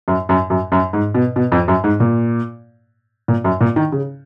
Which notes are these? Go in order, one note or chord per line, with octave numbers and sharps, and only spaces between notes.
F#2
F#2
F#2
F#2
G#2
B2
B2
F2
F#2
G#2
A#2
A#2
F#2
A#2
D#3
C#3